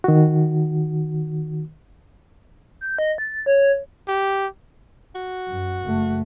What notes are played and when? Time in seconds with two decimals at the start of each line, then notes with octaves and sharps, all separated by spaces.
0.04 D#3 F#4
2.81 G6
2.98 D#5
3.18 A6
3.46 C#5
4.08 G4
5.15 F#4
5.49 F#2
5.86 F#1 A3